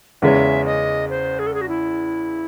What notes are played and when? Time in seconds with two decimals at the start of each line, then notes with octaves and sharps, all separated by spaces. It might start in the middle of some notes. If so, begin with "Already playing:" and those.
0.22 E2 C#3 G#3 C#4 E5
0.65 D#5
1.09 C5
1.39 G#4
1.46 A4
1.54 G#4
1.61 F#4
1.68 E4